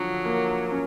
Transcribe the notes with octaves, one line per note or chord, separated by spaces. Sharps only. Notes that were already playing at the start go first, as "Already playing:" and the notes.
Already playing: D3 F3 F#3
A#3
C#4